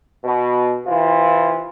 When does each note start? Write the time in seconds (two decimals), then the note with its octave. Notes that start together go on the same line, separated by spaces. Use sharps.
0.24 B2
0.86 C3 E3 F4